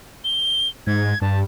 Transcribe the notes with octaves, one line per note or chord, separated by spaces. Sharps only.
G7
G#2 G#6
G2 A5